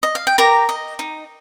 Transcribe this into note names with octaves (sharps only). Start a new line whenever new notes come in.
D#5
F5
G5
G4 A#4 A#5
D#5
D#4